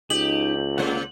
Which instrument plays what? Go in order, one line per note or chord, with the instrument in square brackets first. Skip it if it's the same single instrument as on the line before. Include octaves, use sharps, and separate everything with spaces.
[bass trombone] C#2 [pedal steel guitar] D#4 [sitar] G4 [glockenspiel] F#7
[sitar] C#3 C5 [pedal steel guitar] A#3 F#5